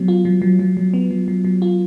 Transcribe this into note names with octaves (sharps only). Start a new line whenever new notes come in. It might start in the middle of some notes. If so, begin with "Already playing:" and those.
Already playing: F#3 B3
F4
F#3
F#3
F#3
F#3
B3
F#3
F#3
F#3
F4